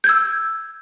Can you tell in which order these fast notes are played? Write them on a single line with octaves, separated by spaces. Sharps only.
G6 G#6 E6